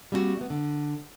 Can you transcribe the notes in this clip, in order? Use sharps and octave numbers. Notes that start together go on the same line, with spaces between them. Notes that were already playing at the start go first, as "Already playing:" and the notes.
G3 A#3 C4 D4 F#4
A3 B3
D3